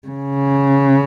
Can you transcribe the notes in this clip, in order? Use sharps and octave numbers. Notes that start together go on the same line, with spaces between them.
C#3